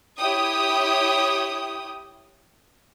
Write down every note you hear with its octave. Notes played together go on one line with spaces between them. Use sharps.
E4 G4 C#5 G5 D#6